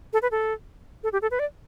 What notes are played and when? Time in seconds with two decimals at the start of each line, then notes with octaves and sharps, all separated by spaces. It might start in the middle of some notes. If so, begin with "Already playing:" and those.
0.13 A4
0.22 B4
0.31 A4
1.04 A4
1.13 G4
1.22 A4
1.31 B4
1.39 D5